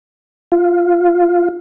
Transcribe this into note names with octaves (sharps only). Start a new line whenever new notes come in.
F4